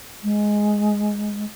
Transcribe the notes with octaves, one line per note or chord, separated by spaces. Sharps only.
G#3